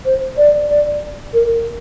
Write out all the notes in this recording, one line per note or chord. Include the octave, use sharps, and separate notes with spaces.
C5
D5
D5
A#4